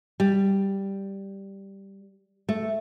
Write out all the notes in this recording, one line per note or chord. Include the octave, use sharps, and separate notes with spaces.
G3
A3